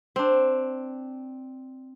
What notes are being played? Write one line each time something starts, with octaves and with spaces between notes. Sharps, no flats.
C4 D4